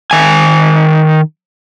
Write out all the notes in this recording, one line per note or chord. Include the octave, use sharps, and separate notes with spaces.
D#3 G#5